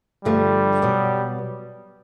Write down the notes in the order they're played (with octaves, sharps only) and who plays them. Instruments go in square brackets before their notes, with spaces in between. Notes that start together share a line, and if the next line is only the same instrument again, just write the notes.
[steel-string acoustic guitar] G2 D3 F3 A3 [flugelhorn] G3
[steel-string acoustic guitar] B2 F#3 B3